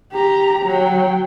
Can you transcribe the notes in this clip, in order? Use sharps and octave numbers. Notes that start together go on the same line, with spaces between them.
G4 A#5
F#3 G5